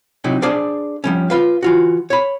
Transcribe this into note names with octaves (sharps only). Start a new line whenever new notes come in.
C3 F#3 D#4 E4
D4 G#4 C5 D5 F5
F3 G3 C#4
F4 B4 F5
E3 F4 F#4
C#5 B5